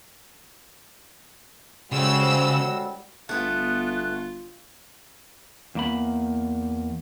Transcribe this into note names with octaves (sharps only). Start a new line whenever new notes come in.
A1 C#3 G3 G#3 F#4 C5 E6
G1 A3 B3 F4 F#6
E2 A#3 B5